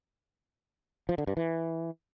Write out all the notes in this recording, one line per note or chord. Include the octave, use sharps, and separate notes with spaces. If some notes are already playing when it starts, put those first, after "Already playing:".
F3
D3
G2
E3